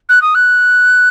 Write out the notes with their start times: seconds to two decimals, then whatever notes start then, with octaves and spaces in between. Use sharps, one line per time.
0.09 F#6
0.22 D#6
0.35 F#6